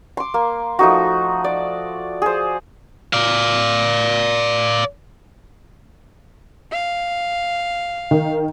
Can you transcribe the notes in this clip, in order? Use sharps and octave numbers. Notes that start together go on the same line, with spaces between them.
C6 D6
A#3
F3 A3 D#4 F#4
D5
G#4 C5
D5 F5
F5
D#3